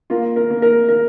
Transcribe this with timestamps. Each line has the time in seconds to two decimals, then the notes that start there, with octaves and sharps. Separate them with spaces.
0.10 A#3 F4
0.36 A#4
0.50 A#3
0.62 A#4
0.89 A#4